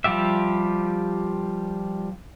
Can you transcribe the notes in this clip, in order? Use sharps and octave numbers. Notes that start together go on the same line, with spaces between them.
F3 G3 F4 G4 E5